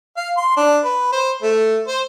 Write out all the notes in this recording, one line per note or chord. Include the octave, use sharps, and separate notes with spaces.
F5
C6
D4
B4
C5
A3
C5